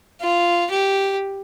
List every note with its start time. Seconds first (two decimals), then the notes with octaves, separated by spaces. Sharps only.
0.21 F4
0.71 G4